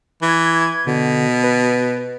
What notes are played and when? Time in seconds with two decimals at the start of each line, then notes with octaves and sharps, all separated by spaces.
0.22 E3 G#6
0.87 B2 D3
1.43 B4